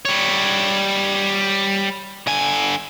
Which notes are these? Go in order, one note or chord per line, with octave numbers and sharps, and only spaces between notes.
G3 C#5
D3 G#5